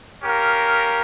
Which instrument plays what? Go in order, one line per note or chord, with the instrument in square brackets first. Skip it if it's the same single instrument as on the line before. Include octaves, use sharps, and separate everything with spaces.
[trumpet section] C#4 G4 A#4 F5